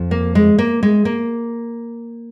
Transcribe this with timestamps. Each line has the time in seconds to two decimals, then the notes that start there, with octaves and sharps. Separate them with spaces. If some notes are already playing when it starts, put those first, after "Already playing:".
Already playing: F2 F3
0.11 A#3
0.35 G#3
0.59 A#3
0.83 G#3
1.05 A#3